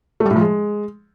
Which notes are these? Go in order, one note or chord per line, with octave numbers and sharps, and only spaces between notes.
A3
G3
A2
F3
G#3